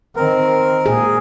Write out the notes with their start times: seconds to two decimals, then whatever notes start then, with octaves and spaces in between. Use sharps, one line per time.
0.16 D#3 C4 A#4
0.86 A#2 G#4